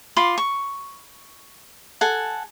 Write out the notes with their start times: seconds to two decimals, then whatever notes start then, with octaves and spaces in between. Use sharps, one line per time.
0.16 F4 B5 C6 D6
0.38 C#6
2.01 A4 F#5 G#5